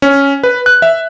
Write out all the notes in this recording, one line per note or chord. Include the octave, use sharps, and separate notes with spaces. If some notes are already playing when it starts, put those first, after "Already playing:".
C#4
B4
F#6
E5